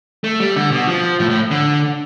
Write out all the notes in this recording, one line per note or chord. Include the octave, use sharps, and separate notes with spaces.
A3
G3
D3
B2
F3
A2
A2
D3